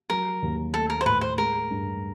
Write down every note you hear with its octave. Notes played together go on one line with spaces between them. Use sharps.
F#3 A#4
D#2
A3 A4
A#4
C5
A2 B4
C5
G#3 A#4
G2